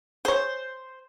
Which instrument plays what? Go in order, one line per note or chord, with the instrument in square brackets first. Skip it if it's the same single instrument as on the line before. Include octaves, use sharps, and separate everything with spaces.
[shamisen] G#4 C#5 [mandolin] C5